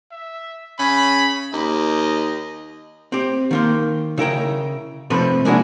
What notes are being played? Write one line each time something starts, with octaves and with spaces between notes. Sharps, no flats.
E5
C#3 B5
D#2 D#5
C4 G4
D#3 A#3 C5
C#3 E4 A#4 G5
C3 F3 A3 C4 A4 B4
G#3 A#3 C#4 D4 E4 F#4